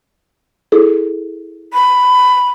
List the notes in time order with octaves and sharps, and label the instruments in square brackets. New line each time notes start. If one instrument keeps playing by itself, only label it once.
[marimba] E4 G#4 A4
[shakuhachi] B5